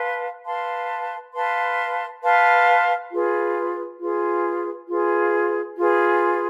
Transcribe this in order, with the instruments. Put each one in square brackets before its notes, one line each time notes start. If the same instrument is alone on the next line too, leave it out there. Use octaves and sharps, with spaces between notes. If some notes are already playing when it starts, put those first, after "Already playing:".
Already playing: [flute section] B4 F5 A5 C6
B4 F5 A5 C6
B4 F5 A5 C6
B4 F5 A5 C6
F4 G#4 B4
F4 G#4 B4
F4 G#4 B4
F4 G#4 B4